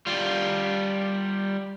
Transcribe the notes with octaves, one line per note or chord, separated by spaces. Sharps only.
G3 F4